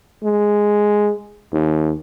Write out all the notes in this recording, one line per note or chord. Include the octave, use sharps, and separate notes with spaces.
G#3
D#2